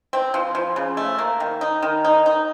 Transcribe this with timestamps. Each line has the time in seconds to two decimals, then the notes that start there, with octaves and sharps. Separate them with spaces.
0.13 C4
0.34 F3
0.55 F3
0.76 C#3
0.97 A3
1.18 A#3
1.40 D#3
1.61 D#4
1.82 D#3
2.05 D#4
2.26 D#4